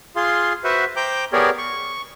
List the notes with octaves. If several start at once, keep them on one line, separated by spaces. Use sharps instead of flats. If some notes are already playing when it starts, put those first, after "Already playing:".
F4 G#4 F5 C6
F#4 B4 C5 E5 F#5
C5 G5 A#5 D6 G6
B3 G4 G#4 A#4 C#5 D5
C#6